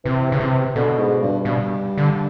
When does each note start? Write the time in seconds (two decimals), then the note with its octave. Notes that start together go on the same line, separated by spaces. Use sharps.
0.05 C3 E3
0.32 C#3
0.40 C3
0.75 B2 D3
0.98 G#2
1.22 G2
1.45 G2 B2
1.98 D3